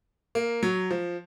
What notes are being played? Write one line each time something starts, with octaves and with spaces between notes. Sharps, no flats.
A#3
F#3
F3